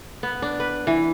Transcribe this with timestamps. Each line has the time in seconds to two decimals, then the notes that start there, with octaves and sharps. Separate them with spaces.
0.23 B3
0.42 D4
0.60 B4
0.87 E3